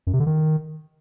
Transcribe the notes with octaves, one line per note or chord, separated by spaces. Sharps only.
F#2
C3
D3
D#3